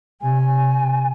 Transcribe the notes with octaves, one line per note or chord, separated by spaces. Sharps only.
C3 G#5